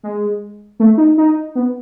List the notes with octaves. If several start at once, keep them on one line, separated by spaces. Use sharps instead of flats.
G#3
A3
D#4
D#4
B3